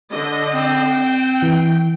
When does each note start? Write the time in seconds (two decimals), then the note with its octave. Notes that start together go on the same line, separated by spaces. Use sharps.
0.11 D3 D#5
0.54 C4
0.90 G5
1.42 E3